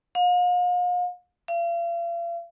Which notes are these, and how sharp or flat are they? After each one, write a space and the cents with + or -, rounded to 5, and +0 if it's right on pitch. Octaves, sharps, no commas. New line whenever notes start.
F5 +40
F5 -40